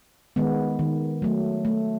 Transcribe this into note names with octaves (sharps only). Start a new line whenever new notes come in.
D#3 G#3 B3
D#3
F#3 A3
A3